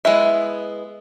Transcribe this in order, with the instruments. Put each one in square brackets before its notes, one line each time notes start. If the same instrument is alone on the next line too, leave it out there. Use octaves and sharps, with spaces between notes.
[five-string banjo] G#3 B3 E4 E5